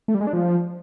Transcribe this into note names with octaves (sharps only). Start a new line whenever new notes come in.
A3
G3
G#3
D4
F3